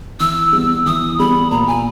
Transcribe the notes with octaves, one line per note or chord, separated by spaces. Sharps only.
E3 E6
G3 B3
E3 D#6
G3 B3 B5
A#2 A#5
G#5